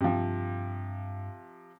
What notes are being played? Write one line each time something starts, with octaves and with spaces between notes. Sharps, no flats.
G2 C3 F3